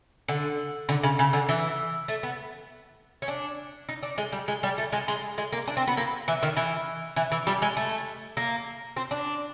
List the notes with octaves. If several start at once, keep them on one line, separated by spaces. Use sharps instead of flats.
D3
D3
C#3
C#3
D3
E3
A3
B3
C#4
D4
D#4
D4
G#3
G3
G#3
G3
A3
G#3
G#3
G#3
A#3
D4
C4
B3
A#3
E3
D#3
E3
E3
E3
G3
G#3
A3
A#3
C4
D4